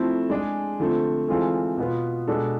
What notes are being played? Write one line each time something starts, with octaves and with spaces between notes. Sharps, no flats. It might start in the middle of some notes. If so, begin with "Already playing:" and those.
Already playing: F3 A3 C4 E4 A4
G#3 D4 G#4
D3 F3 A3 C4
E3 G#3 C4 F4 A4
B2 B3 F4
B2 G#3 D4 A4